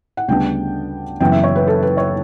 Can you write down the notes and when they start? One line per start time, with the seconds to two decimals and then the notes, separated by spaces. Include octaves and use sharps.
0.17 F#5
0.28 D2 C#3 G3 B3 D4 G5
1.20 F#1 F#2 E3 B3 G5
1.32 E5
1.44 C#5
1.56 B4
1.67 A4
1.83 B4
1.97 C#5